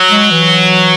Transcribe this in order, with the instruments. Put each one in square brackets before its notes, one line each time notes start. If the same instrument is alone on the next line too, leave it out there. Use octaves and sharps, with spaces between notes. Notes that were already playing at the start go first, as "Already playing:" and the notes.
Already playing: [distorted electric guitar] F#3
[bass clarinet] G#3
E3